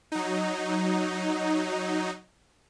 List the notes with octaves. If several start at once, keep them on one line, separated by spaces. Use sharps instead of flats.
F#3 D#4